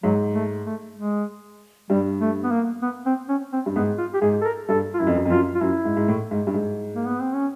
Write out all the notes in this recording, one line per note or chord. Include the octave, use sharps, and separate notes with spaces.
G#2 F#3
A3
A3
G#3
G2 G3
A3
B3
A#3
B3
C4
C#4
C4
G2
G#2 B3
F4
G4
G#2 G#4
A4
A#4
G2 A4
F4
F#2 E4
F2
F#2
F2
F#2 F4
F4
F#2 E4
G#2
G#2
A2
G#2
G2
G#2
A#3
B3
C4
C#4